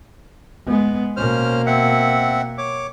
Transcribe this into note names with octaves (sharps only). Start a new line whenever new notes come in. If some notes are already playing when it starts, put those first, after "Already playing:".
G#3 B3
B2 A#3 C#4 C5 F6
C4 E5 F#5
C#5 D6